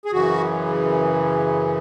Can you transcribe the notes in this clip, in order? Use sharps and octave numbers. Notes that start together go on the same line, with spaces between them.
G#4
F#2 C#3 E3 F#4